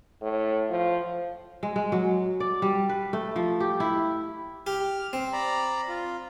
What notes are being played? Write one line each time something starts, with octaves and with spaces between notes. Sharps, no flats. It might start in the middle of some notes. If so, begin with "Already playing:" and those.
A2
F3
G#3
G#3
F#3
D5
G3
B4
A3
F3
G4
E4
G4 F6
C4
D5 A#5 B5
F4